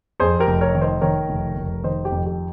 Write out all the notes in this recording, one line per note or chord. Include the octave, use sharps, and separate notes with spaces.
F2 G#4 C5
G4 A#4
F1
A#4 C#5
D#3
C5 D#5
D#3 A#4 C#5
F1
F1
D#3 C5 D#5
G4
F2
G4